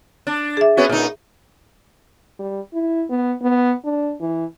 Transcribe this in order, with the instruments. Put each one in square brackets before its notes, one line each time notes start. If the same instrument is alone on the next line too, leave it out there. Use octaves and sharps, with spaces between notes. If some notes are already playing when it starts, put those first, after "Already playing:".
[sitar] D4
[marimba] G#4 E5
[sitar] B3 C#4 F#4
A#2 D#4
[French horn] G3
E4
B3
B3
D4
E3